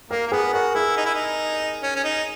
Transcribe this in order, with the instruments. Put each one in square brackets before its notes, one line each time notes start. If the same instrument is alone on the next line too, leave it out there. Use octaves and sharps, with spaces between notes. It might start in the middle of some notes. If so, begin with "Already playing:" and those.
[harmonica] A#3 [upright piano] A#4
[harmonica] A#3
[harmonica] B3 [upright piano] G#4
[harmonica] F#4 [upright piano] A#4
[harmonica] E4 [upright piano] G#4
[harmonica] D#4
E4
D#4
C#4
C#4
D#4